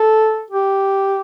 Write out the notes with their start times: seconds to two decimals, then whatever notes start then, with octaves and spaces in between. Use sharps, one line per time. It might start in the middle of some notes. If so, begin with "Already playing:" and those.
Already playing: A4
0.51 G4